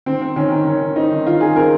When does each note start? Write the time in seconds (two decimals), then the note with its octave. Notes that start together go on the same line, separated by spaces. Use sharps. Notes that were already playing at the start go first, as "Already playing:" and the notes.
0.06 D#3 C4
0.22 C4
0.36 D#3 C#4
0.52 D#3
0.67 D#3 C#4
0.82 D#3
0.96 C4 D#4
1.11 D#3
1.26 D#3 F4
1.40 D#3 G#4
1.56 C4 A#4